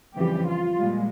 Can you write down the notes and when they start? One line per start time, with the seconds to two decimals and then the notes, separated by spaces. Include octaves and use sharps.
0.15 F2 C#3 E3 G3 G4
0.46 F4
0.78 A#2 G3 G#3